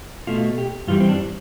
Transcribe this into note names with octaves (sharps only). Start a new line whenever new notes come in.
B2 A3 F4
G4
G2 E3 G3 F4
C4
D4